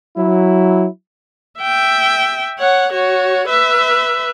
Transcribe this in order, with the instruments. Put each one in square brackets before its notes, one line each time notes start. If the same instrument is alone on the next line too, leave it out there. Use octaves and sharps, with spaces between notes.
[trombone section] F#3 E4
[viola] E5 G5
C#5 F#5
F#4 C#5
B4 E5